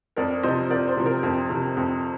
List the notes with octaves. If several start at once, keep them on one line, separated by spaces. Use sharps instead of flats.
F2 A#4 D5
C3 F3 C5 D#5
F2 A#4 D5
C5
C3 F3
A#4
F2
C3 F3
F2